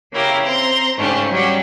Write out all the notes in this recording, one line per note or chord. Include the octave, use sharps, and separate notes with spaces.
C#3 A#3 E4 G4 A#4
C4 A#5 C6
G#2 C#3 A3 C#4 D4 G4
F#3 G3 C#4 F#4 G4